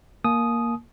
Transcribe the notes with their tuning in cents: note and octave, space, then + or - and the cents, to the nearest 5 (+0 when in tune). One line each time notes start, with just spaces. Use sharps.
A#3 +0 G#5 +45 D#6 +0